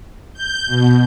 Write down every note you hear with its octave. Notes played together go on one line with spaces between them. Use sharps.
G6
B2